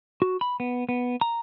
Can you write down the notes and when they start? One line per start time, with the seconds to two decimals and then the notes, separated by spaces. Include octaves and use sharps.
0.22 F#4
0.41 B5
0.60 B3
0.89 B3
1.21 A#5